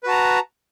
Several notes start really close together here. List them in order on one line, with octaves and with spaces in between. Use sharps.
B4 F#4 A5 A#5